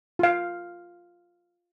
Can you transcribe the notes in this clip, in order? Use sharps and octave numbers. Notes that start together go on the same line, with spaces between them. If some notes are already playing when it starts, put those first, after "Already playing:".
F4 F5